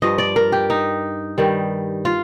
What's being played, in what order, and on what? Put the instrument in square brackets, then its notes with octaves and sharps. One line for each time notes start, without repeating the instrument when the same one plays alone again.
[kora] G2 F3 D#5
D5
A#4
G4
D#4
G2 D#3 G3
F4